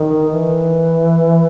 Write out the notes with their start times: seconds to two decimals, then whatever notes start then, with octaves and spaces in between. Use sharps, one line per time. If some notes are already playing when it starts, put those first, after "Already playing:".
Already playing: D#3
0.31 E3